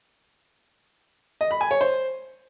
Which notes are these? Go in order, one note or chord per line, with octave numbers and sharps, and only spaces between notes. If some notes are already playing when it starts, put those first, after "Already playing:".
D#5
B5
G#5
C#5
C5